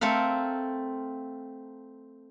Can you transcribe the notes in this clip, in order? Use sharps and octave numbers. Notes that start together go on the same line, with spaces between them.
A3 C4 A4 A#4 F5